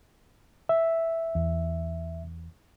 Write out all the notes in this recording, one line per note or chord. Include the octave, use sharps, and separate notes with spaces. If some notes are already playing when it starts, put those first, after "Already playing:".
E5
E2